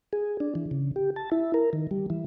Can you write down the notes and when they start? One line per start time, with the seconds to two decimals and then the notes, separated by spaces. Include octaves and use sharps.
0.13 G#4
0.40 D4
0.55 E3
0.71 C#3
0.96 G4
1.16 A5
1.32 E4
1.54 A#4
1.73 D#3
1.91 G3
2.10 E3